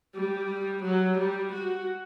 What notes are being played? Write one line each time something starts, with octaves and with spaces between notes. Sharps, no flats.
G3
F#3
G3
F#4